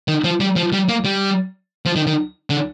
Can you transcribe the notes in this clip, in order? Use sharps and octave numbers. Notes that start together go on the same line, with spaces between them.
D#3
F3
G3
F3
G3
A#3
G3
F3
D#3
D#3
D3